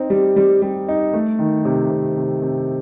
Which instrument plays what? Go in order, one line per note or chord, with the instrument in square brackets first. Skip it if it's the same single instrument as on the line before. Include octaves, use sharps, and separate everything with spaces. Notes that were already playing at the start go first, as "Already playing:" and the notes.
Already playing: [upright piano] C4 D#4
G3
G3
G3
D#4
A3
D#3
C3
C3
C3
C3